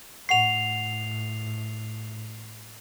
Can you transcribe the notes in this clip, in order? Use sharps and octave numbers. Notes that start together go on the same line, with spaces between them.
A2 F#5 C#6 C7 F7